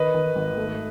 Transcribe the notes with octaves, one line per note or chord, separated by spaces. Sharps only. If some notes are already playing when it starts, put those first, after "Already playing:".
Already playing: D#3 B4 D#5
D#3
G#1
A3